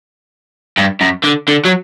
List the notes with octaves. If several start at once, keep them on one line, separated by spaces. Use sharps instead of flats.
G2
F#2
D3
D3
F#3